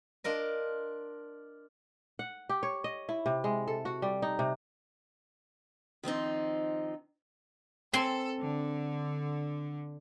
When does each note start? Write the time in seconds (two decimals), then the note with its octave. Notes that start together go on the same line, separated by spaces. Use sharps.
0.24 D4 F4 A#4 D#5
2.19 F#5
2.49 G4
2.63 C#5
2.84 D#5
3.09 E4
3.26 C3
3.44 G#3
3.68 A4
3.85 F#4
4.02 G3
4.22 D#4
4.39 C3
6.03 D#3 F3 C4 D#4
7.94 C4 A4 G#5 C6
8.41 D3